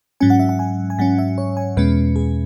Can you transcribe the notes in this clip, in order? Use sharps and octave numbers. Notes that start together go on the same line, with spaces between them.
G#2 F#3 C#4 G#5
F#5
E5
F#5
G#5
G#5
G#2 F#3 C#4 F#5
E5
C#5
G#5
E2 B2 G#3 C#4 B4
G#4